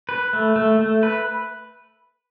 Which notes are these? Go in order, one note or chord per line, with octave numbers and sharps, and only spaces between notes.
B4
A3
A3
A3
B4